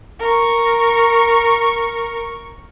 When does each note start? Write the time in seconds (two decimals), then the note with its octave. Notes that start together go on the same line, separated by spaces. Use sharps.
0.20 A#4 C#6